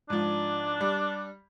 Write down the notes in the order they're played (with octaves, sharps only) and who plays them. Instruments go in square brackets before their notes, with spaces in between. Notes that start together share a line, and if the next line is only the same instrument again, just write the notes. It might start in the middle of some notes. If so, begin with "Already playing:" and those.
[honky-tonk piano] G#2 F3 [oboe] D4
[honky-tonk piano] G3